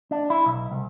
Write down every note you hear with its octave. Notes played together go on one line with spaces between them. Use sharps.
D4
E4
B1
C2